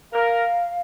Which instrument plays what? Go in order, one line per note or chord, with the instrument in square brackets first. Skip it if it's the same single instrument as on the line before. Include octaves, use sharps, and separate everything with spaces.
[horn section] A#4 [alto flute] F5